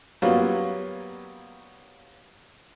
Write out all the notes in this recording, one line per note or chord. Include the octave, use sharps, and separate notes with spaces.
F#3 G3 A#3 B3 C#4 F4